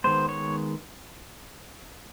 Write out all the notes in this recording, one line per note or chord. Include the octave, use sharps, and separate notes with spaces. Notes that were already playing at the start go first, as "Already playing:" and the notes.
D#3 G#3 B3 C5
C#5